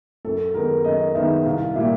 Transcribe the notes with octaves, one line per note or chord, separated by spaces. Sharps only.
F#2 A4
D#3 G#3 B3 D#4 A#4
F#2 D#5
D#3 G#3 B3 D#4 E5
C2 F5
A#2 G3 E5